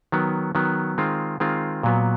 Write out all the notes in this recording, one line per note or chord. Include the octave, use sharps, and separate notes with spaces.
D#3 F#3 B3
D#3 F#3 B3
D#3 G#3 C4 F4
D#3 G#3 C4 F4
A#2 F#3 B3